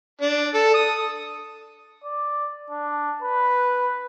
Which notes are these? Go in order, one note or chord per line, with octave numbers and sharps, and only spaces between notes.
D4
A4
D#6
D5
D4
B4